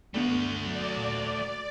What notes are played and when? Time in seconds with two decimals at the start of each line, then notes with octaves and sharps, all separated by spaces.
0.14 G2 A3 B3 D4 F#4
0.66 F#3 D5
0.97 A#2